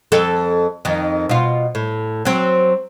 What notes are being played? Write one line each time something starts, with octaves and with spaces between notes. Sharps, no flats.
F2 A4
F2 D#3
B2 F4
A2
F#3 C4